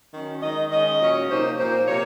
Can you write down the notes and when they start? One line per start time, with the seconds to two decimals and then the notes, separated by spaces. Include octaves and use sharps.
0.13 D#3 F#3 C#4
0.42 D#3 G#3 D#4 D#5
0.71 D#3 G#3 C#4 D#5
1.00 A#2 F#3 C#4
1.30 C3 F3 A#3 D#4 C5
1.58 A#2 F3 A#3 D#4 C5
1.88 C3 F3 A#3 C#5